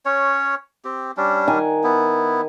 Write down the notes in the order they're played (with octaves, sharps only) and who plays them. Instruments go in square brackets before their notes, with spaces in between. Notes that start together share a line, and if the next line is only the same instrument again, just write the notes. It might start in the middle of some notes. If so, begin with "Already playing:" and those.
[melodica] C#4 C#5
C4 G4
G3 C#4 D4
[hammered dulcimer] D#3 F#5 G#5
[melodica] B3 E4